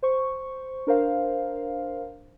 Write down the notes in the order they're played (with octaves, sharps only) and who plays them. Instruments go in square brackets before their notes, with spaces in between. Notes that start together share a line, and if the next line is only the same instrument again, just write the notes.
[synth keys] C5 C#6
D4 A#4 C5 F5